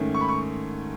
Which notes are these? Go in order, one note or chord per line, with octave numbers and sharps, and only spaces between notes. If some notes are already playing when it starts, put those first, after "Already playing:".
Already playing: G#2 D#3 A3 C#4
C#6
B5
C#6